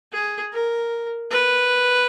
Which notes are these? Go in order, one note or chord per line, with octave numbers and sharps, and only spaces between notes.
G#4
A#4
B4